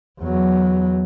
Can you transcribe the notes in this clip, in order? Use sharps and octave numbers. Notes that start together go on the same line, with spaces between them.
E2 F#3